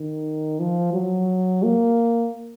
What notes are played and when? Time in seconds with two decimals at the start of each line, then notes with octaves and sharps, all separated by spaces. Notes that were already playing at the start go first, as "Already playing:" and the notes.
Already playing: D#3
0.59 F3
0.94 F#3
1.63 A#3